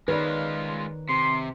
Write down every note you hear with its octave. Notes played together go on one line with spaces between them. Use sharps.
D#3 G#3 F4 B4 C#5 D5
C3 C6